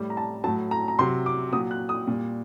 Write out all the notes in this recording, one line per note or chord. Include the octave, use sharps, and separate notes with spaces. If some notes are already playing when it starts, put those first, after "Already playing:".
Already playing: A2 G3
A#5
A5
A2 F#3 A5
A#5
A#5
C3 F#3 C6
D6
A#2 F#3 D#6
F#6
D#6
A#2 G3